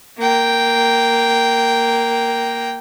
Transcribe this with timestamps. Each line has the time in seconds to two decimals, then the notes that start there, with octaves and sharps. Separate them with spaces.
0.18 A#3 G5